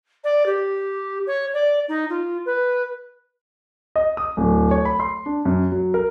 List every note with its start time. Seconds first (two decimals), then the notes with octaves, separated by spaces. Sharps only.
0.24 D5
0.46 G4
1.26 C#5
1.53 D5
1.88 D#4
2.09 F4
2.45 B4
3.96 D#5
4.17 D#6
4.37 D1
4.71 C#5
4.85 B5
5.00 C6
5.26 D4
5.45 F#2
5.72 F#3
5.94 A#4